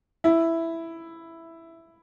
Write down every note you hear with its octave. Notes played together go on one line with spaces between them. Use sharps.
E4